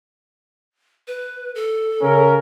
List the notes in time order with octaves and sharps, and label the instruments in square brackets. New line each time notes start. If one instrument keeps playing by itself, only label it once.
[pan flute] B4
A4
[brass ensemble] C#3 C#4 A#4